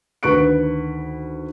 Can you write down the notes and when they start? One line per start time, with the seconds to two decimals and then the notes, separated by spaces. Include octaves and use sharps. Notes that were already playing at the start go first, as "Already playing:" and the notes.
0.23 D2 D#3 B4 C#6 F#6 D7